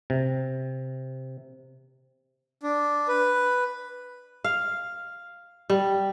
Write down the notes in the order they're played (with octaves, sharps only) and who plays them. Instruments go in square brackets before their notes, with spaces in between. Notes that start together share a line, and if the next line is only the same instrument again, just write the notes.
[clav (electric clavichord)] C3
[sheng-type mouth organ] D4
B4
[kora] F5
G3